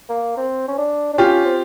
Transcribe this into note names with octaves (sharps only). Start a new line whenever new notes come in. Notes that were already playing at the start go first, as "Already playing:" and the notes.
A#3
C4
C#4
D4
D4
C#4 F4 G4
C4